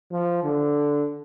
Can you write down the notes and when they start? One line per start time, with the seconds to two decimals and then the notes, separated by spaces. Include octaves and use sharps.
0.11 F3
0.44 D3